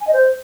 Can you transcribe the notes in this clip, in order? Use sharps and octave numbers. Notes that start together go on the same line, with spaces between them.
G#5
D#5
C5